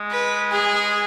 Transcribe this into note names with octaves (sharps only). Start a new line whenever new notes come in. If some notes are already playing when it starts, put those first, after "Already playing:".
Already playing: G#3
B4
G#4